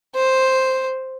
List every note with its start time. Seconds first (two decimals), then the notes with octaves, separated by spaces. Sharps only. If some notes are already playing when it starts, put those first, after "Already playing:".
0.16 C5